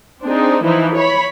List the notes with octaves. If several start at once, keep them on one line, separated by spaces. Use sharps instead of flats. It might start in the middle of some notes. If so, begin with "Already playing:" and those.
C4 D4 D#4 G#4
E3 F3 D#4 E4
C#5 B5